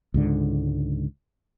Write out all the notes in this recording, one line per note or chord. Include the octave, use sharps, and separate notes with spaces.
C#2 G#2 D3